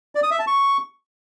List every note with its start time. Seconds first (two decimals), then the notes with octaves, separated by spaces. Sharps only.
0.15 D5
0.23 D#6
0.31 E5
0.39 A5
0.47 C#6